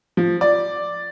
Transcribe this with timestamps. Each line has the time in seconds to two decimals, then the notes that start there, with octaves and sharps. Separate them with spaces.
0.17 F3
0.41 D5